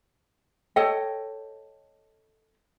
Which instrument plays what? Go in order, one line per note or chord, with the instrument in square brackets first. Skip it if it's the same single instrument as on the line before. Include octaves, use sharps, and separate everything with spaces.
[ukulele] A4 C#5 D#5 G5